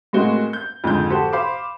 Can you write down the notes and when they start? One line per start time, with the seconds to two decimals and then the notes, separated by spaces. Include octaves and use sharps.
0.13 A2 G#3 A#3 C4 F#4 G7
0.53 G6
0.84 F2 G#2 D3 G6
1.10 F#4 G4 A4 C5 F#5
1.33 C5 F5 B5 C6 D6